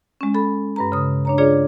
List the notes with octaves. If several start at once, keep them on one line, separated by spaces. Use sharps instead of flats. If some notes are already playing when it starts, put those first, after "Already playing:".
G#3 C#4
A4 B5
G2 B4 A#5
C#3 D#6
D4 C#5 A#5
D4 F4 G#4 C#5 D5